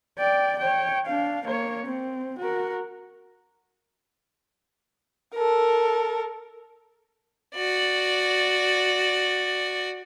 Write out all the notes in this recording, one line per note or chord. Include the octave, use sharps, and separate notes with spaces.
D5 G5
C#5 G5
D4 F5
A#3 C#5
C4
F#4 A#4
A4 A#4
F#4 D5